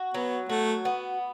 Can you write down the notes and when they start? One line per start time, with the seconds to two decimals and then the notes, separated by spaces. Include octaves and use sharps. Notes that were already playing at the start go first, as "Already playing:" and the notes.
Already playing: F#4
0.14 F#3 B3
0.49 A3 F#4
0.85 B3